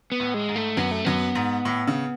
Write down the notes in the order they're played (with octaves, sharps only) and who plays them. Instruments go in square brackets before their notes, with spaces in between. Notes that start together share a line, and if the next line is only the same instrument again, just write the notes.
[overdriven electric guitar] B3
[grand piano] A2
[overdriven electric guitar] G#3
[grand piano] G#2
[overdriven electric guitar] A3
[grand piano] F#2 [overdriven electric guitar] B3
[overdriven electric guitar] A3
[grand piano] F#2 [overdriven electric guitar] B3
[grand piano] G#2
A2
C#3